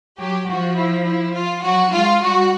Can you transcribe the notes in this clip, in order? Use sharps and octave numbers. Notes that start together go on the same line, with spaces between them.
F#3 G4
F3 F#4
E4
E4
F4
F#3 F#4
G#3 F4
G3 F#4